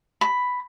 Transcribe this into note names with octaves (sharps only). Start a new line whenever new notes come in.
B5